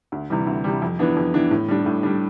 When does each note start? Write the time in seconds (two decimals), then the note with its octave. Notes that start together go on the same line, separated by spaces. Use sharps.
0.12 D2
0.30 C3 E3 G3
0.47 D2
0.64 C3 E3 G3
0.82 F2
0.99 E3 B3 D4
1.17 F2
1.34 E3 B3 D4
1.51 A2
1.68 G3 D4
1.86 A2
2.03 G3 D4